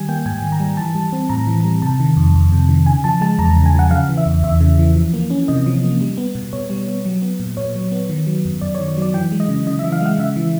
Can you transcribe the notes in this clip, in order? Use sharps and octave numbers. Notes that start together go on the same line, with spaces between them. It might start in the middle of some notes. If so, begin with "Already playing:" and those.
Already playing: D#3 G3 G#5
A#3 G5
G#2 G#5
D#3
A#5
G3
E3 A5
G3
C4
A2 A#5
E3
G3
C3 A5
D#3
F2
F2
C3
D#3
C#3 G#5
F3 A5
G#3 A5
E2 A#5
C#3
G#5
F3 F#5
C#3 F5
E3
E5
E2
E2 E5
C#3
E3
F3
A#3
C#4
C3 D#5
F3
A#3
G3
B3
B2
B2 C#5
G3
B3
F#3
B3
A#2
A#2 C#5
F#3
B3
D#3
F#3
F#2
F#2 D5
C#5
D#3
C#5
F#3 D5
E3 G5
G#3
D#5
C#3
C#3 D#5
E5
E3
F5
G#3 F#5
C#3 E5
E3